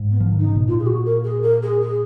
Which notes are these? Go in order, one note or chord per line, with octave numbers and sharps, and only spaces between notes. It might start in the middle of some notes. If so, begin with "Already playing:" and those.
Already playing: G#2
B3
F3
D#3
D#4
C#3
B2
A#2 F4
G#4
F#4
A#4
G#4
A#4
G#4
G#4